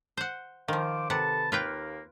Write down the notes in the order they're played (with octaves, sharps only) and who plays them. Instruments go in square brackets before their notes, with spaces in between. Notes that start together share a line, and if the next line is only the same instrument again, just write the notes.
[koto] C5 F#5
[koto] D#3 F3 [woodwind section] C5 F5 D6
[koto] C3 F#5 [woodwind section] A4 B4 A5
[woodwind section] D#2 A#3 [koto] F4 B4 G5